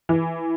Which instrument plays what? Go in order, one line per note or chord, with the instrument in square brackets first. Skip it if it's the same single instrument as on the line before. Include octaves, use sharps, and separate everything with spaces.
[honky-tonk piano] E3